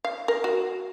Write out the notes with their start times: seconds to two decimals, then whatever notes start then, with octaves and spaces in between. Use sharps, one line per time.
0.05 F5
0.28 A#4
0.44 F#4